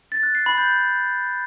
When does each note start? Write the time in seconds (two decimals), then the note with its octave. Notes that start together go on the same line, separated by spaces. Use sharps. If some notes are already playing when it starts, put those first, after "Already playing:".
0.12 A6
0.23 F#6
0.35 C7
0.46 B5
0.58 G6